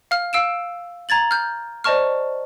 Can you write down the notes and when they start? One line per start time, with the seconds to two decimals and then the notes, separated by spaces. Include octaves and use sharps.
0.11 F5 F6
0.33 F5 E6 D7 E7
1.09 A#5 G#6 A6 F#7
1.31 F6 G6
1.84 C5 D5 D#5 A5 C#6 F6